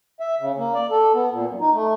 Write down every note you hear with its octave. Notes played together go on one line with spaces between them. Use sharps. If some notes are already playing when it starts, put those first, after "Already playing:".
E5
C#3
A#3
D5
A4
B3
A#2
F#2
D#4
A3